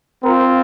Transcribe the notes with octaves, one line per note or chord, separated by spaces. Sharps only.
C4 F4 A#4